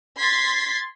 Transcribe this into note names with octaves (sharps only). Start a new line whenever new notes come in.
C6 G#6 A6 B6 C7